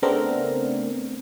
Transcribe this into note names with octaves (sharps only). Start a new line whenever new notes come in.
C#3 A3 B3 C4 D4 A#4